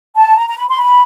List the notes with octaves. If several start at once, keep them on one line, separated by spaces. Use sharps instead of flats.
A5
A#5
A#5
B5
C6
B5